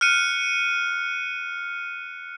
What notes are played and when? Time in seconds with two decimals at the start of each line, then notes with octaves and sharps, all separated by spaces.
0.01 F6 F#6 C#7 D#7